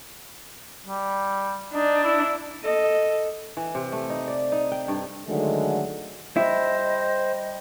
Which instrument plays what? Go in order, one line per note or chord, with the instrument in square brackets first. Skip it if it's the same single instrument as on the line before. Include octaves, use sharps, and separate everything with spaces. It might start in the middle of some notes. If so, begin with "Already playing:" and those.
[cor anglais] G3
[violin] D4 [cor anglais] D#4
[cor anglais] E4
[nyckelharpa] A4 D#5
[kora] E3
C3
A3
D#4
D5
D#4
G5
G2
[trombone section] D3 D#3 F#3 G#3 A3
[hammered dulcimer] G3 [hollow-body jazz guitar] E4 [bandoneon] C5 [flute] D#5